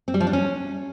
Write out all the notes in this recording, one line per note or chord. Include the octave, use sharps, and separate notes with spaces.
C4
G3
F3
D4
C#4